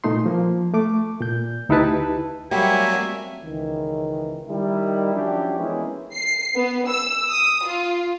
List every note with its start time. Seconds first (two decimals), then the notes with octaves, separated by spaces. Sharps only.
0.04 A#2 A3 D#4 C6
0.26 F3 A#3
0.73 A3 D6
1.21 A#2 G6
1.69 D2 D#4 E4 G4 B4 A5
2.51 F#3 G3 A3 A#3 C4 E5 G#5
3.43 C#2 D#3 E3
4.49 D#3 G3 E4
5.14 F3 F#3 C#4 D4 E4 G4
5.59 E3 G#3 A#3 B3 C#4 E4
6.14 C7
6.56 B3
6.87 E6
7.29 D#6
7.66 F4